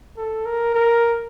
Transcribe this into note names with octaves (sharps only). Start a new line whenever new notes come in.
A4
A#4
A#4